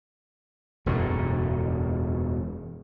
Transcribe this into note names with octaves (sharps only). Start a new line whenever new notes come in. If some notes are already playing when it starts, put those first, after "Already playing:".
E1 F#2 A2